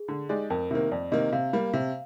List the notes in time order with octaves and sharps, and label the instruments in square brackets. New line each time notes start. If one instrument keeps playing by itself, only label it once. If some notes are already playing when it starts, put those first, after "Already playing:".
Already playing: [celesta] G#4
[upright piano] D3
G#3 D#4 G4 D5
[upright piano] F2 [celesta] A#4
[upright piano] C3 D#3 A#3
[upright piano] F2 [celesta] D5
[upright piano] C3 D#3 A#3 [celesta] D#5
[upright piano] C3 [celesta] F5
[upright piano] G3 A#3
C3